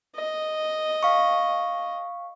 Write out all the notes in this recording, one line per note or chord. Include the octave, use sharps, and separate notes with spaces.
D#5
F5 C#6